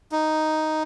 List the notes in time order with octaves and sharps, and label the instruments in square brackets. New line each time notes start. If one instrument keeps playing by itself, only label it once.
[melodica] D#4